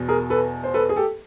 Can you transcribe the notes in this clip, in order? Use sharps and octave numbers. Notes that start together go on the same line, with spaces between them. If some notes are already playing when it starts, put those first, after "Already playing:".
Already playing: E2 B2
G#4 A#4
A4 B4
C5
A4 B4
G#4
G4 A4